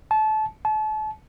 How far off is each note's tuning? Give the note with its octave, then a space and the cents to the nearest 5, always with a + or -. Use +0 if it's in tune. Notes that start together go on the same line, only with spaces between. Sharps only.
A5 -25
A5 -35